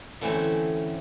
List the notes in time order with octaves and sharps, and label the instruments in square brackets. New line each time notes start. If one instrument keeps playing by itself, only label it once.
[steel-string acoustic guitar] D3 E3 A3 C4 C#4